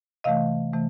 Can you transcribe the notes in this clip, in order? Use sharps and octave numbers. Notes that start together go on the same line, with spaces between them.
C3 E3 A3 D#5 F5
C3 E3 A3